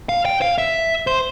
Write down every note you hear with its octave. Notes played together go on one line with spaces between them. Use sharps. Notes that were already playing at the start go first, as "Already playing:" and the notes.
F5
G5
F5
E5
C5